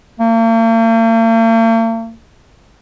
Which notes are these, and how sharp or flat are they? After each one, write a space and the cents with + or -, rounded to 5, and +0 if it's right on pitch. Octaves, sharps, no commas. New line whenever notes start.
A#3 -45